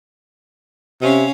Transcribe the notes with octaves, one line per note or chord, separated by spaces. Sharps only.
C3 C#4 F5